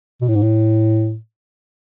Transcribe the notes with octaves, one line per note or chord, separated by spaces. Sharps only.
B2
A2
G#2
A2